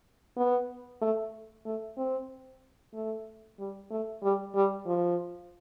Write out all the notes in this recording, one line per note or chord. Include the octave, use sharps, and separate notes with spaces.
B3
A3
A3
C4
A3
G3
A3
G3
G3
F3